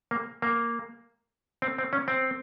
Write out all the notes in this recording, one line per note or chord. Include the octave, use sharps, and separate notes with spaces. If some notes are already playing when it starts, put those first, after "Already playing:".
A#3
A#3
C4
C4
C#4
C4